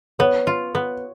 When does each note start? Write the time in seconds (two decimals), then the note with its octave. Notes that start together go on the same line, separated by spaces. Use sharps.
0.19 B3 C#5
0.47 F4
0.75 B3